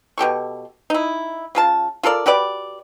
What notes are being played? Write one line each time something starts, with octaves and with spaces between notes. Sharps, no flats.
B2 G4 A4 C#6
D#4 E4
C#3 F4 A5
F4 A4 A#4 D5
F#4 G4 B4 D5